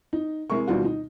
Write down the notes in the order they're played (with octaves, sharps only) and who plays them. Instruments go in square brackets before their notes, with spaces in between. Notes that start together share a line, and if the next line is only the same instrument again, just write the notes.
[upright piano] D#4
C3 G#3 E4 A#4 C#6
D2 B2 D#3 G3 F4 F#4
D#4